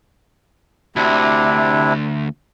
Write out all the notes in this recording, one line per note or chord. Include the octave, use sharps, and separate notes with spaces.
D2 C3 D4 E4